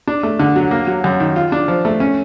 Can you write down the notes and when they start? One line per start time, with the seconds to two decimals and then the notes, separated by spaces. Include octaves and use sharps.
0.07 D4
0.23 A3
0.39 D3
0.56 F#3
0.71 A#3
0.87 F#3
1.04 F#2
1.20 D#3
1.36 F4
1.52 D4
1.68 F3
1.85 A3
2.00 C#4